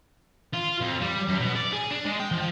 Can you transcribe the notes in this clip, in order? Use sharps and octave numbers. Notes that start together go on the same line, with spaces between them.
F4
F2
G3
F#2
B2
D5
G#4
D4
G#3
G5
F3